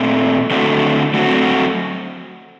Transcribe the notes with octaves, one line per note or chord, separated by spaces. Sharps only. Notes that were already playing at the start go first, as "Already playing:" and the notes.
Already playing: A#2 A3 C4
D3 A3 C4 F#4
F#3 A3 C4 F#4